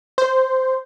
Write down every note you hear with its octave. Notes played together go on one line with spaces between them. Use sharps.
C5